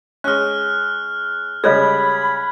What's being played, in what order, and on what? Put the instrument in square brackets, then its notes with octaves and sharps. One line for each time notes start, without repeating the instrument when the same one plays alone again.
[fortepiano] G#3 C#4 [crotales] F6 F#6
[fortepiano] C#3 G3 G#3 [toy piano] A4 C#5 D#5 [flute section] B5 [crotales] G#6